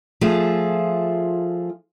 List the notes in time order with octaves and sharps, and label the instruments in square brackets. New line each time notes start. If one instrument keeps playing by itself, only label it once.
[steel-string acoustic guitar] F3 A3 F4 G#4